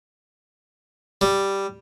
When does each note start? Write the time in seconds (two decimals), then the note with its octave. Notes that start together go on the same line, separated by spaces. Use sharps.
1.21 G3